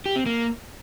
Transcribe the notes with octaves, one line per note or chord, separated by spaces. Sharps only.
G4
C4
A#3